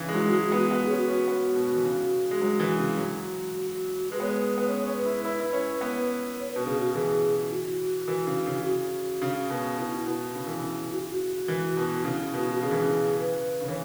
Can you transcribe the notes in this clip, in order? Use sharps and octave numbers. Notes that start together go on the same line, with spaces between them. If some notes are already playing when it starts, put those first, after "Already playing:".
Already playing: C#3 E3
G#3
F#3 E4
G#3 F#4
E4
B3 F#4
B3 F#4
G#4
C#4
F#4
C#4
B3
B2
E3
C#3
G#3
F#3
E3
C#3
F#3 F#4
G#3 B4
B3 C#5
G#3 B4 C#5
B3 B4
C#4 C#5
C#4 C#5
B4
E4
E4 B4
E4
C#4
B3
C#5
B2 B4
C#3 G#4
F#4
E3 G#4
E4
F#4
E3
C#3
C#3
F#4
C#3
B2
B2 E4
E4
B2
C#3
E3
C#3
F#4
E4
F#4
E3
B2
C#3 E4
B2 F#4
F#4
C#3 G#4
E3
C#3
B4
C#3
E3 C#5